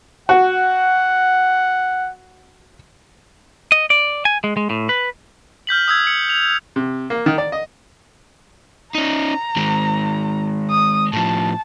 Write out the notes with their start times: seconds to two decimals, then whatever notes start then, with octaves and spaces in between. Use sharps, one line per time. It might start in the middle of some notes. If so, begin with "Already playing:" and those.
0.29 F#4 F#5
3.72 D#5
3.90 D5
4.25 G#5
4.44 G#3
4.57 G#3
4.70 A2
4.89 B4
5.67 F6 G6 B6 F#7
5.88 D#6 E6 G#6
6.04 C#7 F#7
6.29 F7
6.76 C3
7.10 A#3
7.26 D#3
7.38 D5
7.52 D#5
8.95 C#4 D#4 A#5
9.57 D#3 G#3
10.70 D#6
11.13 A2 F3 A5